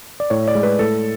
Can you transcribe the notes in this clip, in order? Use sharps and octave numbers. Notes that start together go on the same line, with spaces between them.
D5
A2 C#5
D5
G#3
B4
A2 A4